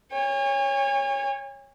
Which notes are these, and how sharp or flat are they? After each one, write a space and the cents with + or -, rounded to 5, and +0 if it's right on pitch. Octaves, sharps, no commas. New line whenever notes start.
C#5 +0 G#5 -40